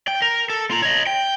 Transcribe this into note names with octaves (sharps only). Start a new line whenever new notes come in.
G5
A#4
A4
F4 A#5
C#5 D#5
G5